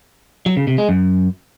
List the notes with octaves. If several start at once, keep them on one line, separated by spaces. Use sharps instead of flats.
F#3
C#3
C3
G#3
F#2